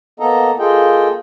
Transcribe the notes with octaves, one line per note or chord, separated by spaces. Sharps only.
A#3 B3 A4 D#5 A#5
A#3 F4 G#4 A4 D#5 G5